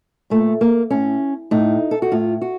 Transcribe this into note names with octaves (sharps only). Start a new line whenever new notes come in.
A#2 A3
A#3
A2 C#4
A2 D#4
A4
F#4
A2 F4
F#4